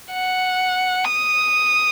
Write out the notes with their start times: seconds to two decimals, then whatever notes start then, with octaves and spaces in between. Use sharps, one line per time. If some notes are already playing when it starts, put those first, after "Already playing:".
0.13 F#5
1.05 D#6